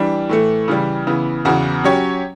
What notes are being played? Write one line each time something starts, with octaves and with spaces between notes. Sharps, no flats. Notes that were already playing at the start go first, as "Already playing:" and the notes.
Already playing: E3 G3 D4
A2 E3 A3
C#3 E3 G3
C#3 E3 B3
E2 C#3 E3 B3 F#4
F#3 C#4 G4 C#5